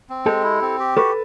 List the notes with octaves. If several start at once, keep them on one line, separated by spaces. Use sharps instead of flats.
C4
G#3 G4 A4
E4
C4
G4
F#4 A4 B4